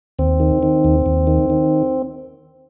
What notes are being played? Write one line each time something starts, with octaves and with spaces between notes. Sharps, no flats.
D#2 C4
D#3
D#3
D#2
D#2
D#3
D#3